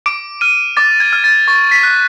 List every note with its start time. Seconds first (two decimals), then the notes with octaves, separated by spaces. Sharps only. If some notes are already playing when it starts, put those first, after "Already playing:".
0.06 D6 D7
0.41 F6 D#7
0.77 D6 A6
1.00 G#6
1.13 F6
1.24 A6
1.48 C#6 A6
1.71 B6
1.83 F#6